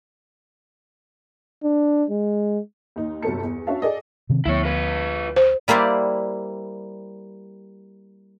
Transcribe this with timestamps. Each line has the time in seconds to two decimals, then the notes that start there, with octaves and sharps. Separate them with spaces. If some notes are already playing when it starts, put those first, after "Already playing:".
1.64 D4
2.10 G#3
2.96 D#2 D#4
3.23 G1 C2 F#3 A4 A5 C#7
3.44 E2
3.67 C#4 D4 F#4 E5 F5 A5
3.82 G#4 A4 D5 D#5
4.30 C3 D#3 C4
4.45 D2 F3 B3 E4 C#5
4.65 F4 B4
5.36 C5
5.68 G3 A#3 E4 C5 D5